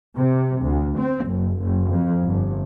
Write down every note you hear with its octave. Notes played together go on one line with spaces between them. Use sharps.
C3
D2
C4
F#1
F#1
F2
G1